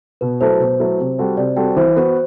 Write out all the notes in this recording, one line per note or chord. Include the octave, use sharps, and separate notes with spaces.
B2 B4
F#3 A3 E4 A4 C5
B2
F#3 A3 E4 A4
C3
G3 C4 F#4 A4
C3 D5
G3 C4 F#4 A4 G5
E3 C5
B3 F#4